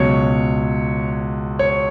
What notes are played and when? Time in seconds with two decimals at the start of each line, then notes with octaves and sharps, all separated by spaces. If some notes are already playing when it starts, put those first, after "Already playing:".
Already playing: C#2 B2 F#3 C#5
1.59 C#5